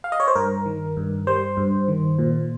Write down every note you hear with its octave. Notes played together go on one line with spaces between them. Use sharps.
F5
D#5
C#5
C5
G2 A#4
D#3
G2
G3 C5
G2
D#3
A#2